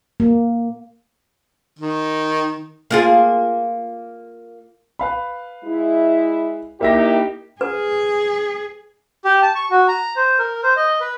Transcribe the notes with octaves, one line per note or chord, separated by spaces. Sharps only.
A#3
D#3
A#3 F4 G#4
B4 F5 B5
G#3 E4
A#3 D#4 E4 G4 E5 A#6
G#4 B4
G4
A5
C#6
F#4
A#5
C5
A#4
C5
D#5
B4